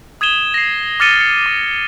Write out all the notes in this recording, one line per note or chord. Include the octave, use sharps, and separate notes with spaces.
D#6 G#6 D#7 E7 G7
A#6 C7
D6 F6 A6 C#7 D#7 G7
C#7
D6